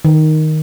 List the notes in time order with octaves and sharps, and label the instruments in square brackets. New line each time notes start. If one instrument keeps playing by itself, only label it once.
[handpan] D#3